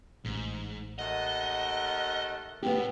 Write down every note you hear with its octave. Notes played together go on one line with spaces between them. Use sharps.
A1 G#2
D#2 A3 D#5 F#5
A2 B3 G4